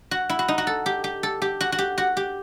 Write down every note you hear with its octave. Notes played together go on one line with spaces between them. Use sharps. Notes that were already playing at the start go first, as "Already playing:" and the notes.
F#4
E4
F#4
D#4
F#4
A4
G4
G4
A4
G4
F#4
F#4
G4
F#4
G4